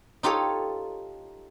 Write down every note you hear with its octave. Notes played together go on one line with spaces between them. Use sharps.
D#4 F4 G4 A4 C#5